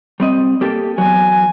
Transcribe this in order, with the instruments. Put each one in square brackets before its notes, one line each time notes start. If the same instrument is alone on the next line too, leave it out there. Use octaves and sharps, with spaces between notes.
[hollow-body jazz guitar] G3 C4 D#5
A#3 G4 A4
[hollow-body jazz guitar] E2 F#3 [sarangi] G#5